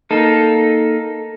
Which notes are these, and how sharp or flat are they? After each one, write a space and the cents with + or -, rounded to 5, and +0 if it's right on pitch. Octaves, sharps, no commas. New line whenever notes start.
A#3 +0 D#4 +5 A4 +0